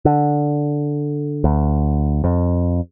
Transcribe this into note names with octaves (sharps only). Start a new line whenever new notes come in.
D3
D2
F2